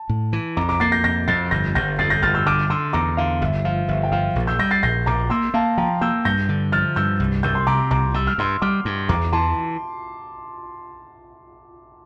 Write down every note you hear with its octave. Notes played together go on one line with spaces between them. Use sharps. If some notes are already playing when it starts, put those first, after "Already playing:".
Already playing: A5
A2
E3
F2 A#5 D6
A#5 D6
A#3 A6 C7
G6 A#6
F2 G6 A#6
F2 A6 C7
G1 G6 A#6
G1 G6 A#6
F2 A6 C7
G6 A#6
G1 F6 A6
E6 G6
D3 D6 F6
D3 C6 E6
E2 A#5 D6
D3 F5
G1 E5
F3 F5
G1 E5
G5
F3 F5
A#1
E6 G6
G3 G6 A#6
A6 C7
A#1 G6 A#6
A#1 A#5 D6
A#3 C6 E6
A#3 F5 A5
F3 G5 A#5
A#3 E6 G6
G2 G6 A#6
D3
F3 F6 A6
G2 E6 G6
C2
C2 E6 G6
C6
C3 A#5 D6
C2 A#5 D6
G3 E6
F6
G2 C6 E6
G3 D6 F6
G2
E2 A#5 D6
E3 A5 C6